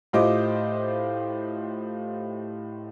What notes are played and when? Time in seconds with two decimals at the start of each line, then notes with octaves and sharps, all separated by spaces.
0.13 A2 F4 G4 C5 D#5 D6